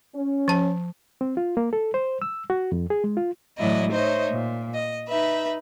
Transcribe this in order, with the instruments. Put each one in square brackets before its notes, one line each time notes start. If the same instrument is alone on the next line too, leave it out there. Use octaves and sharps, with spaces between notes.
[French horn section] C#4
[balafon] F3 A5
[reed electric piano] C4
F4
A#3
A4
C5
E6
F#4
F2
G#4
G#3
F4
[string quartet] A2 E3 F#3 E4 D5 D#5
D#4 C5 C#5 D#5 E5
A#2
D#5
D#4 B4 E5